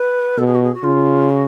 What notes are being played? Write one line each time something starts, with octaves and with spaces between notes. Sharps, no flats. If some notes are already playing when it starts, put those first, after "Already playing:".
Already playing: B4
B2 A4
G#4
F#4
G#4
F#4
C#3 F4
F#4